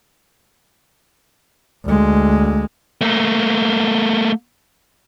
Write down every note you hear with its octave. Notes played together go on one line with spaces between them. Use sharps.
D2 G#3
A3 A#3